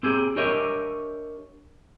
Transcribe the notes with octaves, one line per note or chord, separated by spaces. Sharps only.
C4 G4 G#4
D4 G4 A#4 C#5 D#5 E5